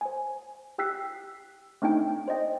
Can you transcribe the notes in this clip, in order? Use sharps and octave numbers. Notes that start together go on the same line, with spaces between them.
C5 G#5
G4 G5 E6 F#6 B6 C7
A3 C4 D4 D#4 G5
C5 D5 D#5 G5